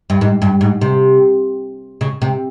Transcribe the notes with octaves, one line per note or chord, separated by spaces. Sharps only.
G2
G#2
G2
G#2
C3
C#3
C3